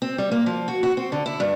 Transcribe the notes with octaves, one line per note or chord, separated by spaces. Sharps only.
C4
G3
A#3
F3
F#4
F#4
C4
D3
E4
G2